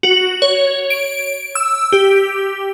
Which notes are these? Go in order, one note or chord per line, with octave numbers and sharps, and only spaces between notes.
F#4
C#5
D7
E6
G4